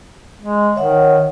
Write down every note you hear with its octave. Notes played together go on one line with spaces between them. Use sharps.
G#3
D#3 C#5 E5 F#5